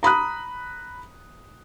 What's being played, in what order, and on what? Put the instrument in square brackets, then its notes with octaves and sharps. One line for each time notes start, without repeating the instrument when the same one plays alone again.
[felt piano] A#5 B5 D#6 F#6